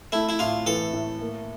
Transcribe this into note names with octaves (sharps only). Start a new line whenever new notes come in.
A3 E4
E4
A2 F4
E3 A4
A2
A#3